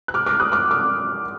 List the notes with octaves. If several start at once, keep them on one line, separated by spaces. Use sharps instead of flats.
F#6
D6 F6
D6 F6
D#6 F#6
D6 F6
D6 F6